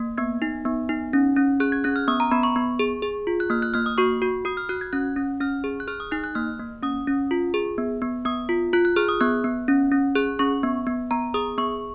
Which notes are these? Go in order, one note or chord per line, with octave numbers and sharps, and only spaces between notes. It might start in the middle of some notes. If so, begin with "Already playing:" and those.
Already playing: A#3
B3 G#6
D#4
B3
D#4
C#4
C#4
G#4 F#6
G#6
C#4 F#6
F6
B3 D#6
A#5
B3 B5
C#6
B3
G#4
G#4
F4
F#6
A#3 F6
F#6
A#3 F6
D#6
F#4 C#6
F#4
F#4 D#6
F6
F#4 F#6
G#6
C#4 F#6
C#4
C#4 F6
G#4
F#6
G#4 F6
D#6
D#4 F#6
F#6
A#3 F6
A#3
C#4 D#6
C#4
F4
G#4
B3
B3
B3 D#6
F4
F4 F#6
F#6
G#4 F6
D#6
B3 F#6
B3
C#4
C#4
G#4 F#6
C#4 C#6
B3
B3
B3 A#5
G#4 D#6
B3 C#6